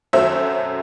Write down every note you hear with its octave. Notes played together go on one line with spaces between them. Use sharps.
F#2 F#3 A3 C5 E5